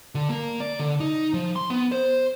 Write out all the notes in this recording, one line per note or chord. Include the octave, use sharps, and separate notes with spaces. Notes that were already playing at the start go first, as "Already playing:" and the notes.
D3
A#3
D5
D3
D#4
F3
C6
B3
C5